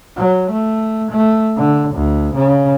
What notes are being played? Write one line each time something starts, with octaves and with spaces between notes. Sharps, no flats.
F#3
A3
A3
D3
D2
C#3